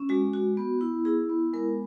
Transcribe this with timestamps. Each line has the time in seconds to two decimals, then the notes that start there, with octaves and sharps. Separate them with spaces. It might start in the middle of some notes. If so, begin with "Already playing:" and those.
Already playing: C#4
0.09 G#3 F#4
0.33 F#4
0.57 B3
0.81 E4
1.05 E4 G#4
1.29 B3
1.53 G#3 A#4